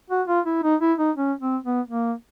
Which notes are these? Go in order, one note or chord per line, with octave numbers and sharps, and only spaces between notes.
F#4
F4
E4
D#4
E4
D#4
C#4
C4
B3
A#3